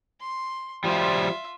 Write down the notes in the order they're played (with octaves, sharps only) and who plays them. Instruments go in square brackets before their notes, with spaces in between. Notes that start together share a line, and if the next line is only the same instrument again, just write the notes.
[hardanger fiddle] C6
[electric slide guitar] F3 G3 [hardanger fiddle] F4 E5